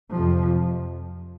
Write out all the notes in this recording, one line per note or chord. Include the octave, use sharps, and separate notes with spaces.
F2 C3 F3